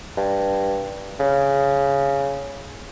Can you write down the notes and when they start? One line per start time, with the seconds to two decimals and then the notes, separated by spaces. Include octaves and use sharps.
0.17 G2
1.19 C#3